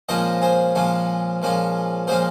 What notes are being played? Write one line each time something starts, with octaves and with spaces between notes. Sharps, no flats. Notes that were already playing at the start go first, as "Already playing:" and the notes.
A#2 F3 G#3 C#4 F4 C5 D#5
G#4 C5
A#2 F3 G#3 C#4 F4
A#2 F3 G#3 C#4 F4
A#2 F3 G#3 C#4 F4 G#4 C5